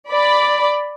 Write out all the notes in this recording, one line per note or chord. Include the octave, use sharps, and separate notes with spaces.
D5 B5